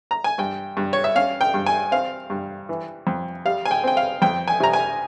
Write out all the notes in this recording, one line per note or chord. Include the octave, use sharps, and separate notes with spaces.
A#5
G#5
G2 G5
G2
C#5
E5
C#4 F5
G5
G2
G#5
C4 F5
G2
E3
F2
G3 F5
G#5
G5
C4 G5
F5
F2 G5
G#5
C3 A#5
G#5